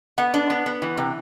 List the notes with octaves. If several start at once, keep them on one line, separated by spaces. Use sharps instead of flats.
B3 F#5
D4
B3
B3
E3
C3